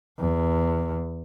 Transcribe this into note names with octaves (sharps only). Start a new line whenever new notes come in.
E2